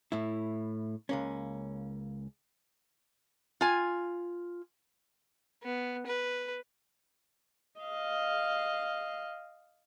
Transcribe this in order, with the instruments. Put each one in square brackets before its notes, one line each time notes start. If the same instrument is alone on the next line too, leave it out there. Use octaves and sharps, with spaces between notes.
[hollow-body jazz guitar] A2 E4
C#2 A#3 C#4
[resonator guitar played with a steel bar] F4 G#5
[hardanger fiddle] B3
B4
[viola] D#5 F5